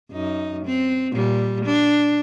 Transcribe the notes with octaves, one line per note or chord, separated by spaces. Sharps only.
F#2 D#4
C4
A#2 G3
D4